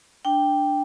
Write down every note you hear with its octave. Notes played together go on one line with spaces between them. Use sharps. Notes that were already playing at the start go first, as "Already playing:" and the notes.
D4 G5